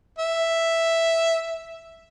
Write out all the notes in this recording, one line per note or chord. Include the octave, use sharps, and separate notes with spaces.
E5